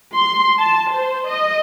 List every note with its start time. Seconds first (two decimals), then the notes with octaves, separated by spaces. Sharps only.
0.14 C6
0.58 A5
0.91 C5
1.27 D#5